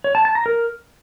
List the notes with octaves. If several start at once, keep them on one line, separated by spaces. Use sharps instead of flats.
C#5
A5
A5
A#5
A#4